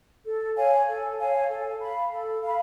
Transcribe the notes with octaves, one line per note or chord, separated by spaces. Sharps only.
A4
C#5 F5 G#5
A4
C#5 F5 G#5
A4
F5 B5
A4
F5 B5